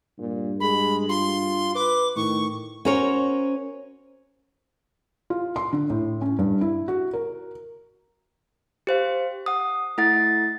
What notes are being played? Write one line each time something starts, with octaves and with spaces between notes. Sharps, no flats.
G2 A#2
G#3 B5
F4 C6
B4 D6
A2 D#3 C#6
C#4 F#4 A#4 C5 C#5
F4
C6
D3
A2
C#4
G2
E4
F#4
A#4
G4 C5 F5
F#5 D#6
A3 E4 A4 F#5 A6